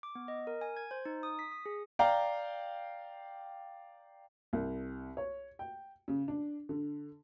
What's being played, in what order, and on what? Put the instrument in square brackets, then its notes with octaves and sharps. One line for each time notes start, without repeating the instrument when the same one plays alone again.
[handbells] D6
B3
D#5
A#4
G#5
G#6
C5
D#4
D#6
B6
D#6
G#4
[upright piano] D5 F5 G5 A#5
C2
C#5
G5
C#3
D4
D3